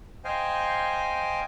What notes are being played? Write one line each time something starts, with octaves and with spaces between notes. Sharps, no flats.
C5 D#5 F5 G5 G#5